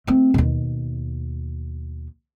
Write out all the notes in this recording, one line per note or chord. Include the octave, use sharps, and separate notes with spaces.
A3 C4
D#2 B2